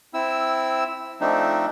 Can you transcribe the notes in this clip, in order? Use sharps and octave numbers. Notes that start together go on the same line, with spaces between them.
C4 E4 E6
F3 A3 C4 D4 D#4